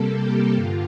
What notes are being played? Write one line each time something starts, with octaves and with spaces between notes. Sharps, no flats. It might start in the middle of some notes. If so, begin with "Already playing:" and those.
Already playing: C3 G3 A#3 A4
G4
G2 D3 F4